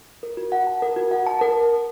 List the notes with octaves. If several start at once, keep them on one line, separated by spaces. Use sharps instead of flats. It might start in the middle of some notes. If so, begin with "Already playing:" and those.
A#4
F#4
F#5
A5
A#4
F#4
F#5
A5
A#4